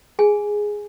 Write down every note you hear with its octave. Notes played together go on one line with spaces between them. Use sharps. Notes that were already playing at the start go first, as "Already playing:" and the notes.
G#4 G#5